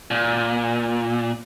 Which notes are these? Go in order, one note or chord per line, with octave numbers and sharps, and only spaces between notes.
A#2